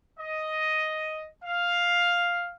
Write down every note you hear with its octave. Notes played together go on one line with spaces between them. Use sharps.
D#5
F5